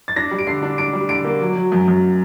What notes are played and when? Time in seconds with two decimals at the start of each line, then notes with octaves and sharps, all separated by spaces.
0.08 A6
0.16 D4 A#6
0.31 G3
0.39 D7
0.47 D3 C7
0.63 D4
0.78 D4 D7
0.93 G3
1.09 D3 D7
1.24 A#3
1.41 F#3
1.56 F#3
1.72 F#2
1.88 F#2